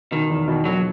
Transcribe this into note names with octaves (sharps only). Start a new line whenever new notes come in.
B2 D#3
E2
B2
A#1 F#3